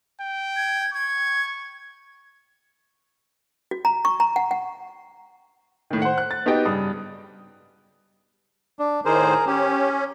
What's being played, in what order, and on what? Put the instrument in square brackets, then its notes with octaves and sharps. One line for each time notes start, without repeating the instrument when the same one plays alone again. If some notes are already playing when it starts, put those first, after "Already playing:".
[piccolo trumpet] G5
[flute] G#6
[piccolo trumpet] C#6 [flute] G#6
[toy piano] F#4
A#5
C#6
A#5
F#5
F#5
[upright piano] A2 D#3
C5 F#5
F#6
A6
B3 D#4 F#4 G4 D#5 G5
G2 C#3 D#6
[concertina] D4
[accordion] A2 D#3 C5 [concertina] G#4 A#4
[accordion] C#4 [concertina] G4